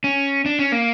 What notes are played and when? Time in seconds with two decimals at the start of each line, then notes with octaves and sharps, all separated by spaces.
0.04 C#4
0.46 D4
0.59 C#4
0.72 A#3